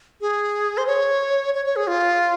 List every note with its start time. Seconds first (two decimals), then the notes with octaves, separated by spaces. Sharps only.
0.21 G#4
0.78 C5
0.87 C#5
1.54 C#5
1.66 C#5
1.76 G#4
1.87 F4